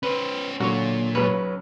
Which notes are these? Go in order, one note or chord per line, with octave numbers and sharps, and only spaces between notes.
C#4 B4 C5
A#2 D3 F#3 F#4 C#5
B1 C#3 F#3 B4 C#5